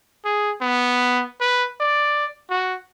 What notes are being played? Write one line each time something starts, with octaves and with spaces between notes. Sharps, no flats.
G#4
B3
B4
D5
F#4